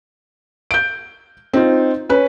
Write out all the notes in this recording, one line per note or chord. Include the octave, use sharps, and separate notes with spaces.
G6 D7
C4 D#4 F4
C#4 B4